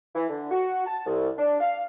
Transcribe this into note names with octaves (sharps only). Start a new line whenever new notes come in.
E3
D3
F#4
A5
C2
D4
F5